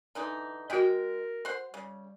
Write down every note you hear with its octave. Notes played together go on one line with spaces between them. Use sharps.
D3 E3 D#4
G#3 F#4 A#4 D#5 G5
C5 F#5 C6
C#3 G3